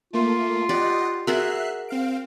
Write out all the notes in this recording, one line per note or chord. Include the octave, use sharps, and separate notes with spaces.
A3 A#3 F4
G4 D5 D#5 F#5
F#4 G#4 A#4 E5 F#6 C7
C4 F5 D7